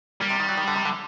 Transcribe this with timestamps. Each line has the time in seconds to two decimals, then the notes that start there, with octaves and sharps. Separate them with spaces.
0.21 G3 A#3
0.30 C3
0.40 D#3
0.49 F#3
0.57 D#3
0.68 D3
0.76 C3
0.85 D3